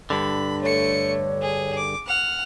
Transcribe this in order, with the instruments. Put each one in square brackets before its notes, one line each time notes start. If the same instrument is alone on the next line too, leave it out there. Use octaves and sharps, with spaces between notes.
[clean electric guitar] G2 D3 [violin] B5
[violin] A3 C#7 [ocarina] C#5
[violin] G#4
D6
F#5 F6